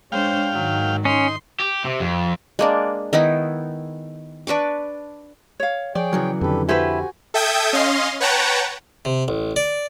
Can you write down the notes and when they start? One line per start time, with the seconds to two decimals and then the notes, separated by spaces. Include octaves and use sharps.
0.12 G#3 D4 C5 C#5 F5 G5
0.52 G#2 D#3 F#3
1.05 C#4 D#4 C6
1.60 G4
1.85 C3
2.00 F2
2.59 G#3 A#3 D4
3.13 D#3 B3 D#4 E4
4.47 D4 B4 C#6 D6
5.60 C#5 F5
5.95 F3 G#4 C#5 D5 G5
6.13 C#3 E3 F#3
6.41 F2 D3 G4 A4 B4
6.69 E4 F#4 G4 A4 B4 C5 G#5
7.34 A4 E5 G5 D#6 G6 G#6
7.73 C#4 D#5 F5 C6
8.20 B4 C#5 F#5 G5 A5 A#5
9.05 C3
9.28 A1
9.56 D5